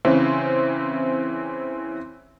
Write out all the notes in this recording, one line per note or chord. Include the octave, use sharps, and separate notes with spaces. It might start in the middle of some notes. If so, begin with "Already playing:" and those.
C#3 E3 C4 C#4